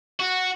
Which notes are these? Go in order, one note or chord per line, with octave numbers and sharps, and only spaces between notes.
F#4